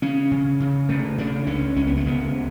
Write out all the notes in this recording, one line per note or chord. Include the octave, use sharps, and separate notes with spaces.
C#3 C#4
C#3
C#3
C#3 A3
C#3 D4
C#2 C#4
C#2 C#4
B3
A3
C#3 B3
C#3